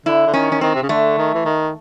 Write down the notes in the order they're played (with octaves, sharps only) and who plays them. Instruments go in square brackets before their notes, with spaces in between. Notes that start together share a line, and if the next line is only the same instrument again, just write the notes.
[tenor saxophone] D3 [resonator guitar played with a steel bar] E4
[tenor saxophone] D3
[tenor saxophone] D#3 [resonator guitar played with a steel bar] C#4
[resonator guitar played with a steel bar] C#4
[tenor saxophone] D#3 [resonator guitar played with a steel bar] C4
[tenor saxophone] C3
C#3
[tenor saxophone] D3 [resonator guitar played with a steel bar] A3
[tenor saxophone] D#3
E3
D#3